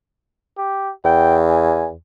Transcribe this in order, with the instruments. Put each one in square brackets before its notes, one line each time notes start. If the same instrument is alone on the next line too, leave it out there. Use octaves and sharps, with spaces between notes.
[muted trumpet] G4
[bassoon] E2 [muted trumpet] G5
[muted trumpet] G#5